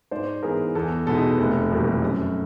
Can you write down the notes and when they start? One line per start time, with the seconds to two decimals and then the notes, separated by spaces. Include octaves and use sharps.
0.11 G#2 C5 D5
0.43 E3 G#3 B3 G#4 A#4
0.75 E2 A4
1.07 B2 G#3 B3 D#4 A4
1.38 F1
1.71 E2 B2 G3 A#3
2.02 F#2 A4